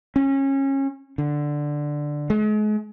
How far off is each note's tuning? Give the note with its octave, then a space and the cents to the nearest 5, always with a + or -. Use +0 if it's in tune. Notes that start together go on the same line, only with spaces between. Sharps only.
C#4 -25
D3 +5
G#3 +40